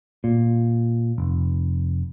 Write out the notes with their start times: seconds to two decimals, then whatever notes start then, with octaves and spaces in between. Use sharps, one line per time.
0.24 A#2
1.18 F1